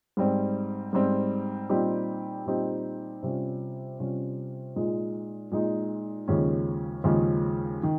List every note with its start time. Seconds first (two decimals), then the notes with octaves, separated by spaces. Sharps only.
0.17 G#2 G3 C4
0.93 G#2 G3 C4
1.70 A#2 G3 C4 D#4 G4
2.45 A#2 G3 C4 D#4 G4
3.23 C3 G3 C#4 F4
3.99 C3 G3 C#4 F4
4.76 A#2 G#3 D#4
5.51 A#2 G#3 D#4
6.28 D#2 C#3 F3 G#3 C#4
7.04 D#2 C#3 F3 G#3 C#4
7.83 D#3